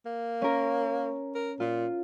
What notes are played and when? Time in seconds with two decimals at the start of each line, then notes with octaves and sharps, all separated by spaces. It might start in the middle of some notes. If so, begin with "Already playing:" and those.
0.06 A#3
0.42 C#4 A#4
1.35 A#4
1.60 A#2 F4